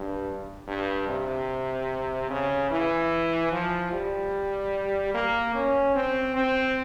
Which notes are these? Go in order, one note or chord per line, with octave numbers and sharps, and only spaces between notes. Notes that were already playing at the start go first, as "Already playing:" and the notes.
Already playing: G2
G2
C3
C#3
E3
F3
G3
A#3
C#4
C4
C4